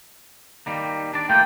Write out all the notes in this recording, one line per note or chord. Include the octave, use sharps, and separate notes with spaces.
D#3 G3 A#3
D4 D5
A3 A#3 F4 G5